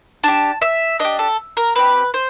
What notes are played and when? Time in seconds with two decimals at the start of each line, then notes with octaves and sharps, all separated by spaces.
0.24 D4 G4 A5
0.62 E5
0.99 D4 G4 D#5
1.19 A4
1.57 A#4
1.75 C4 E4 G4 B4
2.14 C5